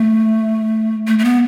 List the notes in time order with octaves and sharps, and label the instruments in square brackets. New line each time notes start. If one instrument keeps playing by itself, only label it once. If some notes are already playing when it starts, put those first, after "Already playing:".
Already playing: [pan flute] A3
A3
A3
B3